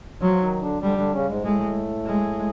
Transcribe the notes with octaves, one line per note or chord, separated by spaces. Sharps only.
F3 F#3 F4
D#3 D#4
D3 D4
D3 G3 D4
D3 D4
C#3 C#4
G#2 G#3
A2 G#3 A3
G#3